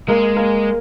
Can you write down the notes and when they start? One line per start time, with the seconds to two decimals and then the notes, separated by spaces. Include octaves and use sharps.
0.08 G#3 A#3 A#4
0.37 A#3 A#4